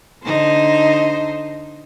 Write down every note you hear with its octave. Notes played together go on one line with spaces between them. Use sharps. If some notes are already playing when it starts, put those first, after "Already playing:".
D3 D#4 C5